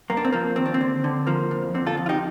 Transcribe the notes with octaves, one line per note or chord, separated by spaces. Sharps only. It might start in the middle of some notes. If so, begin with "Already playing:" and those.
G2 A#3
D4
C4
F3 A#3
D#2 C4
D4
C4
D3
D3
F3 A#3
F2
D3 C4
F4 A4
F2
F4
D#4 G4